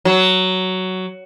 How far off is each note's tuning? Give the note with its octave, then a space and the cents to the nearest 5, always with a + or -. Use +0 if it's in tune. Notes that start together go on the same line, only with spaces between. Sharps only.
F#3 +10